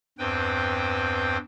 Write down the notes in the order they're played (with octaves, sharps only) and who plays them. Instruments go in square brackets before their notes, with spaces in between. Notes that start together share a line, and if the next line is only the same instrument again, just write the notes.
[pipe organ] E2 G2 C4 B4 C5 G5